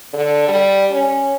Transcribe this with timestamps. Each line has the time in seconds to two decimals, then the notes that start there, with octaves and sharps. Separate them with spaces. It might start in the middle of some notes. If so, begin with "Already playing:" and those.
0.13 D3
0.48 G3
0.91 C#4